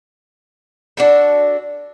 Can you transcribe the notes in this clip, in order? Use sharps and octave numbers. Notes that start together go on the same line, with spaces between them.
D4 F#4 A4